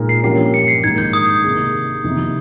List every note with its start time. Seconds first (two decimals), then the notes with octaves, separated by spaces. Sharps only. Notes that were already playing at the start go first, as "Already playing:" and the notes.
Already playing: A#2 G#3 D#4 A#4
0.09 C7
0.23 G2 F3 A#3 C#4 G4 C7
0.54 C#7
0.68 C7
0.84 G#2 D#3 A#3 D#4 G#6
0.98 G6
1.13 D#6
1.43 C3 D#3 A#3 D#4 G#4
2.04 F2 C3 D#3 A#3 D#4